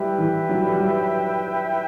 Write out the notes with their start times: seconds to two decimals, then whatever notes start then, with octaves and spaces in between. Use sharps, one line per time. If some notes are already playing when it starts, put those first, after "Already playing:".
Already playing: G3 E4 B4 E5 G5
0.18 E3
0.49 F#3
0.62 G3
0.75 F#3